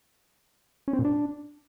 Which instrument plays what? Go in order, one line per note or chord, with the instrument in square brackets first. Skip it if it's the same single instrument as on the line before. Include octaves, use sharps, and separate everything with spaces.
[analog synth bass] C#4
C4
A#2
D4